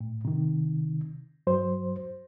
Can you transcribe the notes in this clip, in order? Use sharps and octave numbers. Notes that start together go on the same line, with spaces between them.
A2
C3 D#3
G2 F#3 C5